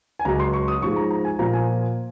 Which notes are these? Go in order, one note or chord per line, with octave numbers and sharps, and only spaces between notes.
G#5
C#2 C#3 F#3 A#5
C6
C#6
D#6
G#2 F3 G#3 C#6
A#5
A#5
G#5
A#2 F3 A#3 A#5
G#5